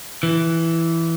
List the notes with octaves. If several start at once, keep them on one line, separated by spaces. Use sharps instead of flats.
E3